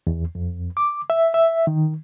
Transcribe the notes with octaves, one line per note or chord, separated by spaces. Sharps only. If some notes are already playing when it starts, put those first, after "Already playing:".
E2
F2
D6
E5
E5
D#3